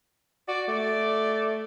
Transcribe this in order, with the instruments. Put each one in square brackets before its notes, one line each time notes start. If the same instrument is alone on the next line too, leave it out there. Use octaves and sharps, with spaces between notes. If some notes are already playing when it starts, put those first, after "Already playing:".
[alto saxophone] F#4 [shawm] D5
[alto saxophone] A3 [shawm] D5